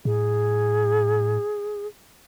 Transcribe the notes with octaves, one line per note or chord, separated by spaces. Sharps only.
A2 G#4